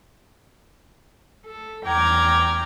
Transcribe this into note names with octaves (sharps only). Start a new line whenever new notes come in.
A4
E2 G5 A#5 D6 F6 G#6